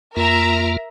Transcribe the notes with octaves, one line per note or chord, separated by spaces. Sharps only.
F2 A#3 F4 A#4 E5 A#5